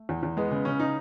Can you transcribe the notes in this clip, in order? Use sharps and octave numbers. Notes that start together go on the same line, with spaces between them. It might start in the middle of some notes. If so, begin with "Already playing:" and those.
Already playing: A3
E2
E2
G#3 B3
C#3 B3
C#3 C#4
D#4